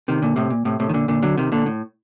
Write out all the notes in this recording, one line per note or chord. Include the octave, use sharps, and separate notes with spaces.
C3 D#3
A#2 D3
A2 C3
A#2
A2 C3
A2 C3
D#3
A#2 D3
A#2 D3
D3 F#3
C3 D#3
A#2 D3
A2